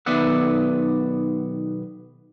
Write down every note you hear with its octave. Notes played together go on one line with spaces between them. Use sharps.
B1 D#3 B3 D5 E5 F#5